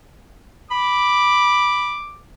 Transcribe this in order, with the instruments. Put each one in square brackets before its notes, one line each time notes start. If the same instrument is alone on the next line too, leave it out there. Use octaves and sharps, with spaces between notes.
[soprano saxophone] B5 [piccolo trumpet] D6